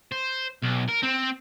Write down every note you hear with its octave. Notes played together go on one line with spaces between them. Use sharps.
C5
B1
A#4
C4